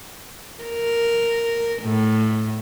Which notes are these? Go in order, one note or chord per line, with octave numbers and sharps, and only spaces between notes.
A#4
A2